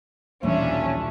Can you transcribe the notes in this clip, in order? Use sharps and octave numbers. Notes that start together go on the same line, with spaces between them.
D#1 B1 E3 G3 A#3 C#4 D4 E5